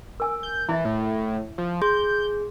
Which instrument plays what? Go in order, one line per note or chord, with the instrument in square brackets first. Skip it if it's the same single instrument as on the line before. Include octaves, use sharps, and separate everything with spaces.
[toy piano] A#4 G#5 E6
[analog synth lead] G6
[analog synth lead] E3 [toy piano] E4 E5
[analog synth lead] A2
F3
[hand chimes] G#4 [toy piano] C6 [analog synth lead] G6